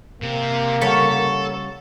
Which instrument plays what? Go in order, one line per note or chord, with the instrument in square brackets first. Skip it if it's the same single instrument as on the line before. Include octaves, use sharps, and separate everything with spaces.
[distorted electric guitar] C3 [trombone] A#3
[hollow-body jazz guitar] C#3 G3 F#5 [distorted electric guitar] A4 [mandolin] C#5 B5